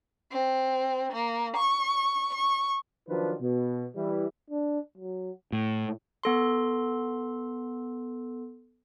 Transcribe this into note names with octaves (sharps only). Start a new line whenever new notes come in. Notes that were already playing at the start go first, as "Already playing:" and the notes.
C4
A#3
C#6
C#6
D#3 F3 F#3 D4 F4 B4
B2
E3 G3 E4
D4
F#3
A2
B3 A4 C6